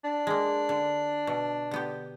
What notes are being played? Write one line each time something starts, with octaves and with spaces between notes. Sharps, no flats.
D4
G#3 A#3
D3
B2
D3 B3 G4